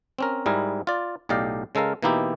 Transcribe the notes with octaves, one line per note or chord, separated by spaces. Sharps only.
C4 C#4 A#4
G#2 G3 E4 G#4 A#4
F4 D5
B1 A2 G4 D5 D#5 F5
C#3 G#3 A4 A#4 F5
B2 E3 A#3 D#4 E4 G4